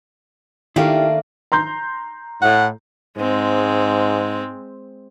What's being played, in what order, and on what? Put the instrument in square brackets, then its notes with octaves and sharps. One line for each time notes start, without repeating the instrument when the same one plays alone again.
[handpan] D#3 F5 [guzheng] A3 A#3 D4 [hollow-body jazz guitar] E4 G4
[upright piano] A#5 C6 G6
[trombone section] A2 [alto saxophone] F#5
[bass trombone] G#2 [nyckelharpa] G#3 C4